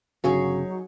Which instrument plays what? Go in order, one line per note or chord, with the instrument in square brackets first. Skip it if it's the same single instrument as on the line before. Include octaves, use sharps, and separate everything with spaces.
[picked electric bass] G1 C#3 [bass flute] F#3 [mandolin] D#4 G#4 C#5 [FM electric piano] F#4